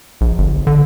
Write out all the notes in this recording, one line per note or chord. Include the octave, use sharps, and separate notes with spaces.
A#1
G1
D3